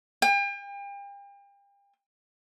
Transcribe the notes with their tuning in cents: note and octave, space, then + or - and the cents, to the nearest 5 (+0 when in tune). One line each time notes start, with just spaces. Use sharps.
G5 +40